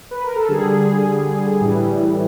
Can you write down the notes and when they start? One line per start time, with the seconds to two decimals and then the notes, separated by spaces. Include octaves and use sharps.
0.11 B4
0.24 A#4
0.36 A4
0.49 D3 G3 G#4
1.60 A2 E3 G3